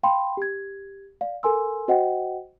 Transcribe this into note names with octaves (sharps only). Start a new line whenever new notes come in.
F5 G5 B5 C6
G4 G#6
D5 F5
A4 A#4 G#5 C6 E6
F#4 C5 D#5 F#5 G5